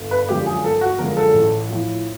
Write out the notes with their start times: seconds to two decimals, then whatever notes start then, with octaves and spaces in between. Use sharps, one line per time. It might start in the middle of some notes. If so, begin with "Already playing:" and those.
Already playing: G1
0.11 B4
0.29 F#2 D3 F3 G#3 G4
0.46 G#4
0.63 G1 A4
0.81 F#4
0.99 F#2 D3 F3 G#3 A#4
1.17 A4
1.34 A1
1.69 A2 F3